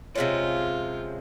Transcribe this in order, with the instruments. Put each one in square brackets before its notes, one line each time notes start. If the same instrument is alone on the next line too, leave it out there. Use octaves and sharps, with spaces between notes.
[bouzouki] C3 F3 G#3 C#4 [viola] F4